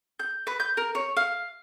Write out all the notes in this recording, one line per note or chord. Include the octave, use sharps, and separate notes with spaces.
G6
B4
G6
A#4
C#5
F5